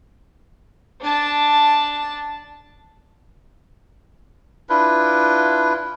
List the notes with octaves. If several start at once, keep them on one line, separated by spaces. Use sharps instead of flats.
D4 A5
D4 E4 F4 B4